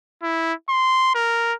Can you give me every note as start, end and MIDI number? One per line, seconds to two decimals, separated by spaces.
0.23 0.53 64
0.69 1.12 84
1.15 1.53 70